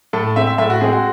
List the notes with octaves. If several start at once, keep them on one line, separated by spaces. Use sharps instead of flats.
A2 A4
G#3 C4 E5
E5
A2 E5
F#4
G#3 C4 G#4
F#4